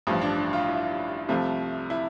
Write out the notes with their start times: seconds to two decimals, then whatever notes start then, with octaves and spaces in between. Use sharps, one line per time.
0.07 A1 G2 F3
0.22 D4
0.38 D4
0.53 F4
0.69 E4
1.29 C2 C3 F3 A3
1.90 E4